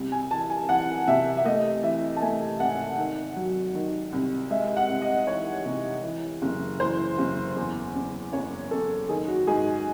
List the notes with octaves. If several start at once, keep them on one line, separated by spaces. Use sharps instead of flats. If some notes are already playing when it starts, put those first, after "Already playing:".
Already playing: C2
G#5
E3 A5
G#5
E3 F#5
C3 E5
E5
A3 D#5
E3 E5
A5
A3 G#5
G#1 F#5
D#3
F#3
D#3
C2
G#3 E5
F#5
C2
D#5
E3 C#5
C3
E3
F#1
E3 C5
F#1
E2
F#1
F#1 C#5
F#1 A4
D#3 G#4
F#4
G#2 G#4